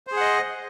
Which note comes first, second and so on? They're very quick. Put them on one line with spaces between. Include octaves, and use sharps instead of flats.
C5 G#4 F#5 D#5